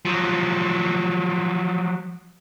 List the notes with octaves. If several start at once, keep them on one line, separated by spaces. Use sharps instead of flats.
F3 F#3